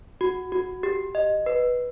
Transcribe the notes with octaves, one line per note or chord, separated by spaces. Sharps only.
F#4
F#4
G4
D#5
B4